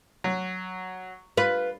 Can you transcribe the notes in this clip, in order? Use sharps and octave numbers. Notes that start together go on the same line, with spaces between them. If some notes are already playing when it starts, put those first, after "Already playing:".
F#3
F4 B4